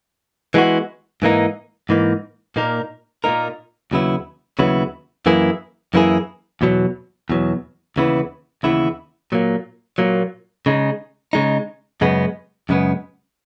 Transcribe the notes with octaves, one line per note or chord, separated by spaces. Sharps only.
E3 G#3 B3 F#4
G#2 E3 A#3 D#4
G#2 E3 A#3 D#4
A#2 A#3 D#4 A#4
A#2 A#3 D#4 A#4
D#2 C#3 F#3 B3 E4
D#2 C#3 F#3 B3 E4
F#2 E3 A#3 E4 G#4
F#2 E3 A#3 E4 G#4
E2 B2 F#3
E2 B2 F#3
D#2 C#3 E3 B3 E4
D#2 C#3 E3 B3 E4
A#2 F#3 A#3
A#2 F#3 A#3
C#3 G#3 D#4
C#3 G#3 D#4
F#2 C#3 G#3 B3
F#2 C#3 G#3 B3